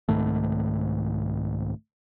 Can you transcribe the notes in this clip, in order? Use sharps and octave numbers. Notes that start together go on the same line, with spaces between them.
C2 G#2 D#3 A3